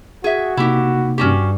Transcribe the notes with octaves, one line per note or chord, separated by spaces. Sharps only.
F#4 G#4 E5
C3 A#3 D#4 E4 G4
G2 C#4 F#4 G4